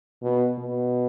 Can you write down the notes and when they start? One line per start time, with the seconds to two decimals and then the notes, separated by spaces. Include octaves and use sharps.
0.23 B2
0.59 B2